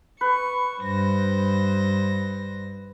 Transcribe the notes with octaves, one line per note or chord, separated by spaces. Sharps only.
B4 C#6
G2 C5 A#6